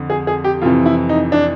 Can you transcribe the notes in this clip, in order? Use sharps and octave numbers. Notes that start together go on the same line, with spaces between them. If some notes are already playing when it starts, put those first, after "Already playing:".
Already playing: F2 D3
G#4
G#4
G4
F2 C3 E3 F4
E4
D#4
D4